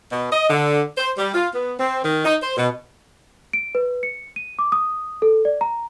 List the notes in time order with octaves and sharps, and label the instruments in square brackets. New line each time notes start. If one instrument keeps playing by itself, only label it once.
[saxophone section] B2
D#5
D3
C5
G3
F4
B3
C4
D#3
D#4
C5
B2
[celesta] D7
B4
C#7
D#7
D6
D#6
A4
D5
A#5